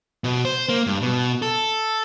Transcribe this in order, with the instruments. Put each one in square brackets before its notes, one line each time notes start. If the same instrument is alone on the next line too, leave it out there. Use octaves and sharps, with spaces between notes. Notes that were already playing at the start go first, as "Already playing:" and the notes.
[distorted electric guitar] B2
C5
A#3
G2
B2
A4